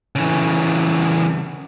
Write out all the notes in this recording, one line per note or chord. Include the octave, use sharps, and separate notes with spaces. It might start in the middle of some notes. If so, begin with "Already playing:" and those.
C#3 E3